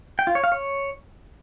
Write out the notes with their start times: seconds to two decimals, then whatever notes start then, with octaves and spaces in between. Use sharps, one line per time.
0.19 G5
0.27 F4
0.35 C#5
0.44 F5
0.52 C#5